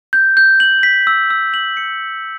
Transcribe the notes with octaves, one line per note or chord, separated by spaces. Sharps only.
G6
G6
F#7
B6
E6
E6
F#7
C#7